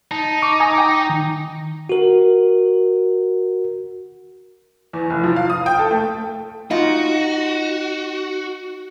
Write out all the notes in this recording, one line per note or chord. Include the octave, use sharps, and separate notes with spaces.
D#4 A5
C#6 D6
G#5 A#5 D#6
G5 D6
D#3
F#4 A#4
E2
F1
F3
F5
D#6
G5
A4
A3
D#4 F4 F#4